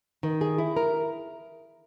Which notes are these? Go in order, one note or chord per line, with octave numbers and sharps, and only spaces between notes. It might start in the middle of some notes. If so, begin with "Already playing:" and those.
D#3
G#4
E4
A#4